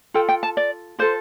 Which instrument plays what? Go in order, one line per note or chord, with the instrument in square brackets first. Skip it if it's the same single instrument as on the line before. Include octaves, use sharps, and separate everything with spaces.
[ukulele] F4 A4 G5
G5
A5
D5
F4 A4 C5